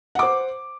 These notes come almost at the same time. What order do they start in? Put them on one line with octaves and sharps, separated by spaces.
F#5 D6 C5